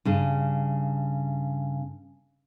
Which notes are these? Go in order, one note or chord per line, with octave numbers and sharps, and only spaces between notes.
G2 C#3